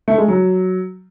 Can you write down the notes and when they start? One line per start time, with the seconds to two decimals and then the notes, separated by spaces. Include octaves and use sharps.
0.08 A3
0.18 G#3
0.28 F#3